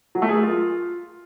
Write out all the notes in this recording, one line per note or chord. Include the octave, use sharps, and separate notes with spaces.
F#3
A3
G#4
A#4
F4